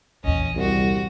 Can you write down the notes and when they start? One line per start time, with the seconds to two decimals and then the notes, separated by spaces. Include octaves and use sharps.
0.24 A#1 E2 C#4 D#5
0.56 C2 C4 F#4